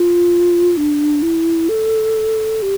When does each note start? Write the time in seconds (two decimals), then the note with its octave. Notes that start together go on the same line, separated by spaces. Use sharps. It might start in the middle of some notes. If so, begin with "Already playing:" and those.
Already playing: F4
0.77 D4
1.22 E4
1.69 A4
2.62 G4